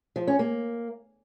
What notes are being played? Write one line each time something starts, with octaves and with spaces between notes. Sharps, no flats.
F3
C#4
A#3